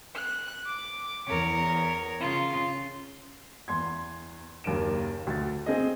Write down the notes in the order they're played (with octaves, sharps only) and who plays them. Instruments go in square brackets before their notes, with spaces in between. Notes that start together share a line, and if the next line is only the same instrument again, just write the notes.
[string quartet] F#6
D6
E2 A#4 C#5
C#3 F4
[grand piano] E2 C6 G#6
F#1 D#2 D#3 A#3 D7 E7
D2 A6
C4 G#4 D#5